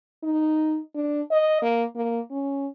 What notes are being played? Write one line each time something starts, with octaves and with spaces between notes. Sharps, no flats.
D#4
D4
D#5
A#3
A#3
C#4